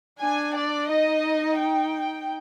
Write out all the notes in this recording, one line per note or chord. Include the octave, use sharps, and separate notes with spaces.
D4 G#5
D5
D#4 D#5
G5